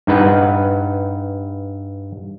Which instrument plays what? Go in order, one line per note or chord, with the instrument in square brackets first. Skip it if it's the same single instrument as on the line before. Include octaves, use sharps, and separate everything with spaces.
[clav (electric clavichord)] G2 D#4 B4 F#5